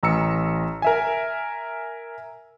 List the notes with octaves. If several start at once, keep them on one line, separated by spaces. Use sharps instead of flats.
A1 A#5 E6 C#7
A#4 E5 G#5